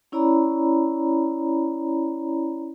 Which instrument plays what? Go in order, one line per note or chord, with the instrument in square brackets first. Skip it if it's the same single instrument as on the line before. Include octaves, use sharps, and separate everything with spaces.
[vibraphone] C#4 E4 C#5 D5 A#5 B5